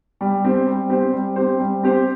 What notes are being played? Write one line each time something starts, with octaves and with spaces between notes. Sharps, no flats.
G3
C4 G4 C5
G3
C4 G4 C5
G3
C4 G4 C5
G3
C4 G4 C5